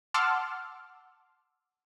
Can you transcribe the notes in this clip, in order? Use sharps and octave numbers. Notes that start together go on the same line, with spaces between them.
F#5 A5 C6 D6 E6 F6